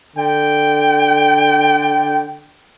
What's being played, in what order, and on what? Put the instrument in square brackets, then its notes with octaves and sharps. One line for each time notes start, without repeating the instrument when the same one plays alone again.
[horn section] D3 G5